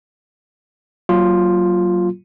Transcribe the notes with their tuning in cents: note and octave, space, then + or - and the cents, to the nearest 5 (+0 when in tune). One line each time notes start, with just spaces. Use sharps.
F#3 +20 A#3 +0 F4 +0